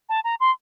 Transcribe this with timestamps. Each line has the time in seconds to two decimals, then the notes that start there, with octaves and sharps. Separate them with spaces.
0.09 A5
0.24 A#5
0.40 C6